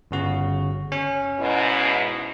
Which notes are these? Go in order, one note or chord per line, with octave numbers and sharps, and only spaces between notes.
G1 C#3 F#4
C#4
G#2 B2 E4